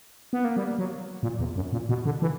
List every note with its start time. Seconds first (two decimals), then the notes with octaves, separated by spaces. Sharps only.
0.33 B3
0.45 A#3
0.57 G3
0.79 F#3
1.23 A#2
1.39 E2
1.56 F#2
1.73 A#2
1.89 B2
2.05 D3
2.22 E3